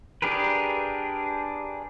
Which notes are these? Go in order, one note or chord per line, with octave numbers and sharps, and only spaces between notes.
D4 G4 G#4 A#4 B4